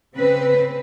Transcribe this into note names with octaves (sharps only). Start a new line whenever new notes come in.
C#3 C4 B4